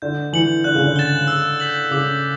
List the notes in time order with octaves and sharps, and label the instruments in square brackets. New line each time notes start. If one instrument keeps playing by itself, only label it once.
[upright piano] D3 [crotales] G6
[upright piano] E3 [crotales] C#7 F#7
[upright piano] D3 [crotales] F#6
[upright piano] C#3
D3
[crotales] A6 E7 G7
E6
G6 B6 F#7
[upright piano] C#3 [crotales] D6